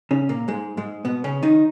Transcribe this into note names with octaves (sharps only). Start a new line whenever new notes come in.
C#3 C#4
A#2 A#3
G#2 G#3
G#2 G#3
B2 B3
C#3 C#4
D#3 D#4